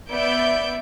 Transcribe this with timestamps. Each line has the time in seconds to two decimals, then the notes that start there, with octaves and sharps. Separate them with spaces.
0.11 B3 D5 E5 G6 D7